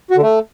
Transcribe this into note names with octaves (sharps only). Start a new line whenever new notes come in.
F#4
D3
A3